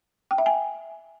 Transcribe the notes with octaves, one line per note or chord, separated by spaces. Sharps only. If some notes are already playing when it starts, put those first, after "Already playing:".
G5
E5
G#5